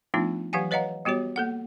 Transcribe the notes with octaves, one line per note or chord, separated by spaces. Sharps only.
F3 A3 B3 D4 D#4 F4
E3 F#3 G4 F5 F#5 G#5
B4 C#5 D#5 F5 F#5 A#5
G3 B3 F#4 G4 C#5
A#3 A4 F#5